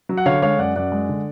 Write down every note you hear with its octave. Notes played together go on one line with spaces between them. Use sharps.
F#3
F#5
D3 C#5 F5
G#3 C#5 F5
F#2 D5 F#5
F#2 D5 F#5
G#3
D3